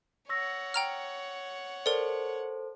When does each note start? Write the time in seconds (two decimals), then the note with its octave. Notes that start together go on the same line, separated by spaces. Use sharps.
0.29 C#5 F#5 C#6 E6 A#6
0.74 G5 A#5 F6
1.86 A4 A#4 C5 D5